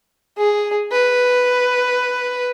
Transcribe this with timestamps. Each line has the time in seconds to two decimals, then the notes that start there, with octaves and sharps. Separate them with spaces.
0.38 G#4
0.92 B4